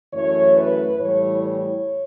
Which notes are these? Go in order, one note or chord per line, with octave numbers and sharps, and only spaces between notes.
F#2 E3 A3 C#5
B4
A2 E3 G3 C#5
C#5